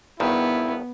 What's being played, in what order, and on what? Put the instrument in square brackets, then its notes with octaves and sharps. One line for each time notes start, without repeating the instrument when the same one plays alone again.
[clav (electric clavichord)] G#1 G2 D#3 [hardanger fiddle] B3 [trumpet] E4